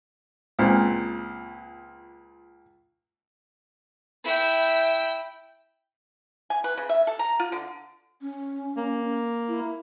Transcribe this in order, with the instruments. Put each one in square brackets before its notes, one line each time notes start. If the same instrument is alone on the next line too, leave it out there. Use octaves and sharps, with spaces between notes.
[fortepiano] C#2 A#2 C4
[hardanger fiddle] E4 G5
[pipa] G#5
B4
C#3
E5
A4
A#5
F4
D3
[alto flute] C#4
[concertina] A#3
[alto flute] E4